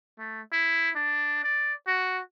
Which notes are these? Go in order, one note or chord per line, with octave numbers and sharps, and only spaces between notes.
A3
E4
D4
D5
F#4